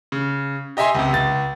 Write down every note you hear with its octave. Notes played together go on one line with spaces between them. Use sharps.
C#3
G4 D#5 E5 G#5 C6
C#2 C3
C#2 A6